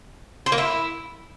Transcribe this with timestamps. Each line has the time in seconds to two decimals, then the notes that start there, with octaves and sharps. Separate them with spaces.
0.46 C5
0.52 A#3
0.58 E4